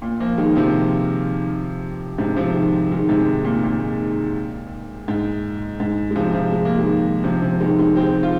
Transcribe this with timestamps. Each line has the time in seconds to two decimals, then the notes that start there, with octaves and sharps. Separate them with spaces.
0.02 A#2
0.20 F3 A#3
0.38 D#3 G#3
0.56 C3 F3
2.18 G#2 C3
2.36 C3 F3
2.54 D#3 G#3
2.91 D#3 G#3
3.09 G#2 C3
3.44 A#2
3.64 A#2
5.08 G#2
5.80 G#2
6.11 G#3
6.16 C3 F3
6.34 C3 F3
6.53 G#3
6.65 A#3
6.78 D#3 G#3
7.24 C3 F3
7.42 C3 F3
7.61 D#3 G#3
7.79 D#3 G#3
7.96 G#3 C4
8.23 F4